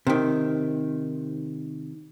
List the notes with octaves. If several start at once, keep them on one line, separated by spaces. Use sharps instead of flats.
C3 D#3